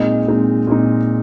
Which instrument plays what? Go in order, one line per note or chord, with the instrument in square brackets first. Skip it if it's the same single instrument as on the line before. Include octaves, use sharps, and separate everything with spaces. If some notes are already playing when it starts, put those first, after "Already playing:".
Already playing: [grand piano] A#2 G#3 C4 D#4 D#5
A#2 G#3 C4 D#4
A#2 G#3 C4 D#4